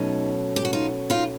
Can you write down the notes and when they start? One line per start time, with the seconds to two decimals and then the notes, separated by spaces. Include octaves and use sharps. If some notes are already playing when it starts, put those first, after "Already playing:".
Already playing: B2 F#3 A3 C#4 D#4
0.56 G4
0.65 F#4
0.73 D#4 F4
1.10 D#4 F4